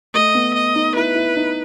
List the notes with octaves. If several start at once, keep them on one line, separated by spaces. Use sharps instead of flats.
A3 D#5
B3
D#5
D#4
E4 B4
E4
D#4